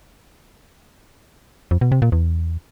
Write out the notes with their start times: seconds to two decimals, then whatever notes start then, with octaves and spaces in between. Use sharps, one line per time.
1.71 F2
1.81 B2
1.92 C3
2.02 A#2
2.12 E2